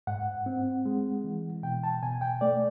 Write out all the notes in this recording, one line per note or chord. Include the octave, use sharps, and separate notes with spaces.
G#2 F#5
C4
G#3
E3
B2 G5
A5
B2 G#5
G5
A3 D5